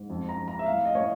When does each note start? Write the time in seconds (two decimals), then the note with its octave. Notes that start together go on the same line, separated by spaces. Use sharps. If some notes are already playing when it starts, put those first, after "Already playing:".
Already playing: G#2
0.10 F2
0.29 A#5
0.38 F2
0.48 A#5
0.59 E5
0.66 A2 F5
0.85 D#5
0.95 A2 C#5